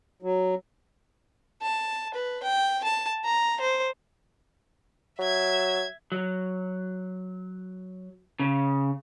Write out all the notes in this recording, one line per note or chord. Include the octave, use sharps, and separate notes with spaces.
F#3
A5
B4
G5
A5
A#5
C5
F#3 E5 G#6
F#3
C#3